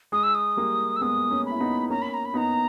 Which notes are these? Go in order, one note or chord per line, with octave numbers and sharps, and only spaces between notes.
G#3 D#6
E6
D#6
G3 A#3
E6
G#3 B3 D#6
A#3 C#4
B5
E4
B3 D#4
A#3 C#4 A#5
B5
A#5
B5
B3 D#4 A#5